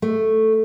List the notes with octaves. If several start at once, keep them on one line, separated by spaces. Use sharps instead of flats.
A3